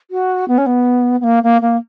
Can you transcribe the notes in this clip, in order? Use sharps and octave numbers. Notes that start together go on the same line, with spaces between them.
F#4
B3
C#4
B3
B3
A#3
A#3
A#3